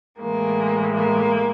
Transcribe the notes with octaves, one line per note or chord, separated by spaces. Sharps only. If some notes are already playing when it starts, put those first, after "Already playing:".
A2 E3 G#3 A#3
A#3